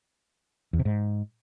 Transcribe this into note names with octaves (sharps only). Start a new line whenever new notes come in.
E2
C3
G#2